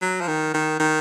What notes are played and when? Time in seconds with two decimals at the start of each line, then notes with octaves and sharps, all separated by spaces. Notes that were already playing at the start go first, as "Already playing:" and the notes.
0.02 F#3
0.21 F3
0.28 D#3
0.54 D#3
0.80 D#3